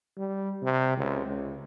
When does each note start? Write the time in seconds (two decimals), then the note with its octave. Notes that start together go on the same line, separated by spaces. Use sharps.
0.17 G3
0.63 C3
0.97 C#2
1.26 C#2